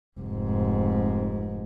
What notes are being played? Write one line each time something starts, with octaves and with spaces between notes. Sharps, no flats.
F1 G#2